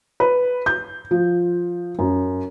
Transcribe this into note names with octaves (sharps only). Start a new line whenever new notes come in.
B4
G6
F3
F#2